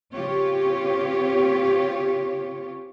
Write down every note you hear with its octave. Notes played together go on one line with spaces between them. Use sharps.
C#3 C4 F4 G4 C#5